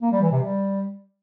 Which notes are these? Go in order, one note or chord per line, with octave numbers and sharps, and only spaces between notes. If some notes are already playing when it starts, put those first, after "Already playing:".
A#3
G3
E3
C3
G3